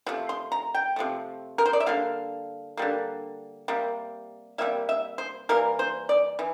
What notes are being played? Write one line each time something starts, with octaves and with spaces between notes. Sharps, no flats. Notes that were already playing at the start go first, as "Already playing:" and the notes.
C3 F3 A3
C6
A#5
G5
C3 F3 A3
A#4
C5
D5
E5
D3 G3 A#3 F5
D3 G3 A#3
C3 G3 A#3
C3 G3 A#3 E5
E5
C5
E3 G3 A#3 A#4
C5
D5
E3